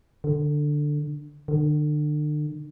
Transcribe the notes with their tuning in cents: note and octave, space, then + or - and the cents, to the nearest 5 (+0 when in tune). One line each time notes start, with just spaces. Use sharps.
D3 +10
D3 +35